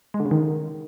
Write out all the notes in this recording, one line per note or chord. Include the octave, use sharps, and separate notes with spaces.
G#3
D3
C#3
D#3